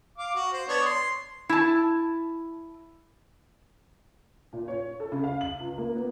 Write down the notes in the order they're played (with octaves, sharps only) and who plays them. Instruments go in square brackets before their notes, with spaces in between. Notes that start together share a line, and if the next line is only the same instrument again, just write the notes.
[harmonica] F5 D6
F#4
C5
B3 D4 C#5
C6
[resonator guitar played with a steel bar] E4 A5
[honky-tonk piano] A#2
C#5
A4
C#3
F5
F#7
C#2
A#3
B3